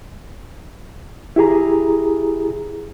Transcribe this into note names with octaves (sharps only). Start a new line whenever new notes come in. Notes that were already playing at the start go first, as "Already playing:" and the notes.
E4 G4 G#4 A#5